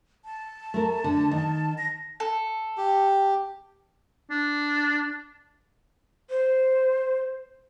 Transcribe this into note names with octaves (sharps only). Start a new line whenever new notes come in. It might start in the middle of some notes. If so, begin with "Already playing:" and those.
A5
A3 A#4
D3
D#3
A#6
A4
G4
D4
C5